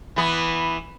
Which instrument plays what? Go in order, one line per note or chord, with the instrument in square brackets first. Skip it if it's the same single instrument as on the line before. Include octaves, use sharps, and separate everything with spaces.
[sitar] E3 B3